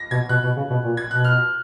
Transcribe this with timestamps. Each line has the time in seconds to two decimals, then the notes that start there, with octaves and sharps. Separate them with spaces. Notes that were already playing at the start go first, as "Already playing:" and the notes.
Already playing: A#6
0.11 B2 G#6
0.29 B2 F#6
0.43 B2
0.57 C#3
0.70 B2
0.84 A#2
0.97 G#6
1.11 B2 F#6
1.24 F6